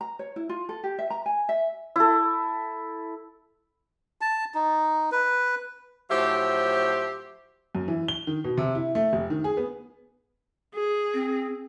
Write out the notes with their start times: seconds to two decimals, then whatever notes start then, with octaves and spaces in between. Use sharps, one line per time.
0.01 A#5
0.19 C#5
0.36 E4
0.49 F4
0.69 A4
0.84 G4
0.99 E5
1.10 A#5
1.26 G#5
1.49 E5
1.96 E4 A4
4.21 A5
4.55 D#4
5.12 B4
6.10 A2 F3 F#3 G4 C5 E5
7.75 F#2
7.88 E3
8.08 G7
8.27 D#3
8.44 B2
8.57 C3
8.75 E4
8.95 A3
9.13 F1
9.30 D#3
9.44 G#4
9.57 B3
10.75 G#4
11.14 C4